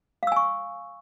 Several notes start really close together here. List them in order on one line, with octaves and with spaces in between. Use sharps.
F5 E6 G#5 C#6